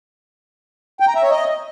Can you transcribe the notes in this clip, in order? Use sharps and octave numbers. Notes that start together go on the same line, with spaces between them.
G5
A#5
E5
C#5
D#5